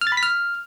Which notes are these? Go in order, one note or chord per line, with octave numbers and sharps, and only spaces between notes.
F6
A6
B5
B6
F6